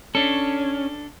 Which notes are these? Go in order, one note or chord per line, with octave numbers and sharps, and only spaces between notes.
C#4 D4 A4